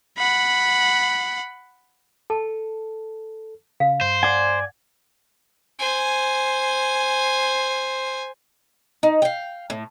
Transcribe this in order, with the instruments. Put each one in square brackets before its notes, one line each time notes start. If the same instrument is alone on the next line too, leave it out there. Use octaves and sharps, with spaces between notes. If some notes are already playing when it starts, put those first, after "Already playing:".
[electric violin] F#5 B5
[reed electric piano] A4 [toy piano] A5
[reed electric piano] C#3 [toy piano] F5
[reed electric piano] G2 [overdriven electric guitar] C5
[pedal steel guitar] D5 G#5 [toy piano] F#5
[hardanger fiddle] C5 G#5
[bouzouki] D#4
F5 G5
A2